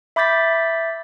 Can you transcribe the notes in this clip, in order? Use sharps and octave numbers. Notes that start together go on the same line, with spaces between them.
E5 B5 D6 G6 A6 B6